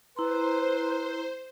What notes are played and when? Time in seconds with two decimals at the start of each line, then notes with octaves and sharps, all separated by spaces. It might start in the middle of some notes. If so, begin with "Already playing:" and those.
0.16 E4 B4 C5 A#5 C6